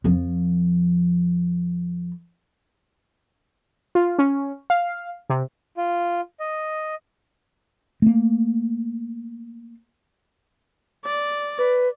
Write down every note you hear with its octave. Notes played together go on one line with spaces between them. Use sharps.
F2 F3
F4
C#4
F5
C3
F4
D#5
A3 A#3
D5
B4